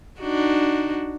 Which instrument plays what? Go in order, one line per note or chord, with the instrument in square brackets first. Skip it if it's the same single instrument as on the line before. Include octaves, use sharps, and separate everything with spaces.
[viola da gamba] D4 D#4 F#4